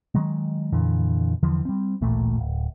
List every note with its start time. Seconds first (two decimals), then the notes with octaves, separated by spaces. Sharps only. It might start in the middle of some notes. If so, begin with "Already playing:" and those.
0.15 D#3 F#3 G#3
0.73 F2 A#2 D3 E3
1.43 E2 D3 E3 F3
1.65 G3 C4
2.01 D1 A1 A#2 A3
2.39 D1